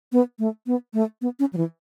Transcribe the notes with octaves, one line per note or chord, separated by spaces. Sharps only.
B3
A3
B3
A3
B3
C#4
F#3
E3